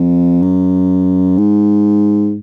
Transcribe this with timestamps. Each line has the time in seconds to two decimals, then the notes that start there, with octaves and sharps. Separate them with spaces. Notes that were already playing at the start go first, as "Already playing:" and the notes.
Already playing: F2
0.42 F#2
1.38 G#2